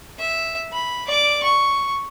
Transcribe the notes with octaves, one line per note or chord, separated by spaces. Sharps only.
E5
B5
D5 D6
C#6